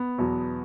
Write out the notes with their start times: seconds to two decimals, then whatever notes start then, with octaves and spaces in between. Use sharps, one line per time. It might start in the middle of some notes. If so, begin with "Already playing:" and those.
Already playing: B3
0.18 E2 B2 F#3